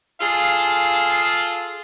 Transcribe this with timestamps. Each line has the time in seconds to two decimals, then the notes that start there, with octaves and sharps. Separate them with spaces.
0.21 F4 G#4 A4 F5 A5